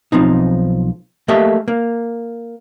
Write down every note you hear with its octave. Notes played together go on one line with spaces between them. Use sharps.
B1 F3 C4 D#4
A3 A#3 G4 A4 D#5 E5
A#3